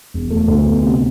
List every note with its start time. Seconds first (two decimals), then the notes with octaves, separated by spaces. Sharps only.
0.14 E1
0.30 A3
0.48 D2
0.65 B3
0.83 C3